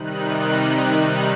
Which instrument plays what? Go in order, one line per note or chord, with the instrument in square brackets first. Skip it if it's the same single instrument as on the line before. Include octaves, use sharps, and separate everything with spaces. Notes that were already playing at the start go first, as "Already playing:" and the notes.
Already playing: [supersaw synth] C3 D#3 G3 D#4 F#6